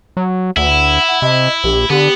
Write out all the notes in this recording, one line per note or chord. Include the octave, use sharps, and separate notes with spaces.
F#3
D2 E4 F#5
F#5
C3 D#5
A#1 G4
D3 B3 G4